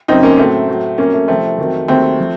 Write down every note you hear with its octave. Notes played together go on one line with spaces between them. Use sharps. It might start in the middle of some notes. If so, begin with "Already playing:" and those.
F#2 C#3 F#3 C4 D#4
A#3 C#4
A2 F#3 A3 C4
A2 F#3
C2 A#2 F#3 A#3 C#4
A3
C2 C3 F3 A3 C4
F2 D#3 F#3
D#2 D#3 F#3 A3 C4
F3